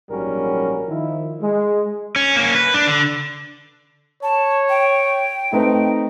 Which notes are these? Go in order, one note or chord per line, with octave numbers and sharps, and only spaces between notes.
A#1 G#2 F#3 G3 C#4 A#4
D#3 F3 E4
G#3
C#4
A#3 C#4
B4
D4
D3
C#5 A5
G5
A3 C4 D#4 B4